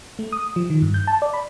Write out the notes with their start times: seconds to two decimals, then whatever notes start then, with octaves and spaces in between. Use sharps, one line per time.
0.19 A3
0.32 D#6
0.56 F3
0.70 D#3
0.82 G2
0.94 G6
1.07 A5
1.22 D5
1.34 B5